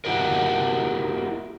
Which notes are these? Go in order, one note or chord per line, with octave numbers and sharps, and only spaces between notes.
E4 F#4 G4 A#4